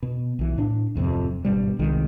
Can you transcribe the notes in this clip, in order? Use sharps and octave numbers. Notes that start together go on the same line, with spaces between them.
B2
B1 E3
A2 D4
D1 F2 C3 C4
G#1 G2 B2 G3
C2 D#3 G#3